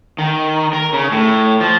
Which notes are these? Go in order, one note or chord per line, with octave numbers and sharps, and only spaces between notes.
D#3
A#4
C#3
A2
F3